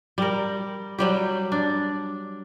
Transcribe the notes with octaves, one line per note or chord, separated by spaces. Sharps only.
G3 A#4
F#3 G3 G4
D4